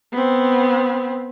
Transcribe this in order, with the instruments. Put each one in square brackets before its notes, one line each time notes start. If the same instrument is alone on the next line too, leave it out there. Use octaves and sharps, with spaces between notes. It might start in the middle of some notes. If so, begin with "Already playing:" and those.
[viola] B3 C4